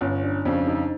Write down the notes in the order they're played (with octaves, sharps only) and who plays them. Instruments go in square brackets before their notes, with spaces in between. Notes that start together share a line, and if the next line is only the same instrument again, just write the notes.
[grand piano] G1 [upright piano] C#4
[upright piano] D4
[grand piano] F2 C#3 [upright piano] D4
[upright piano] D#4